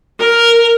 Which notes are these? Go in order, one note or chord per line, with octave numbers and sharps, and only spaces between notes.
A#4